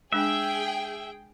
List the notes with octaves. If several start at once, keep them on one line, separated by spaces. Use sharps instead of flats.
G#3 D4 G#4 E5 G5